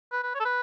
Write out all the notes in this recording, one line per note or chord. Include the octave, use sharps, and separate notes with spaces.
B4
B4
C#5
A4
B4